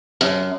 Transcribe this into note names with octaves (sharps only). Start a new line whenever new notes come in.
F#2